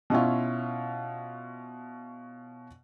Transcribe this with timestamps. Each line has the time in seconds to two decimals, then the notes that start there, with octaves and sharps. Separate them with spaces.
0.10 B2 C#4 E4 F4